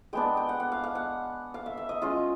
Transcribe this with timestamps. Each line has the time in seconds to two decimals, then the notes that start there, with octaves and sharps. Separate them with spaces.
0.13 G#3 B3 D4 G5
0.37 G5
0.49 F#5
0.60 F#5
0.72 F5
0.84 F5
0.95 F#5
1.54 F5
1.66 E5
1.77 E5
1.89 D#5
2.02 G#3 C#4 F4